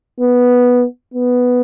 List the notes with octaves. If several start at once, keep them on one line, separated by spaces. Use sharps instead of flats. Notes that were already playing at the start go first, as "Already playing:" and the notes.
B3
B3